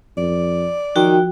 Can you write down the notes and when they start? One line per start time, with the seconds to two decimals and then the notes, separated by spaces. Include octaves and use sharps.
0.17 F2 D5
0.96 D#3 F3 F#4 G5